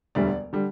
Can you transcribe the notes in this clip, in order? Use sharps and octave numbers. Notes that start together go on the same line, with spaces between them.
E1 D2 D3 G3 D5
D3 G3